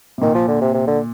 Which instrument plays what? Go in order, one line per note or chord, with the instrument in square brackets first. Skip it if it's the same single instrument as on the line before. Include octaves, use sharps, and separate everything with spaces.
[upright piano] C3
[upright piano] A#2 [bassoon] D#3
[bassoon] F3
D3
C3
C3
D3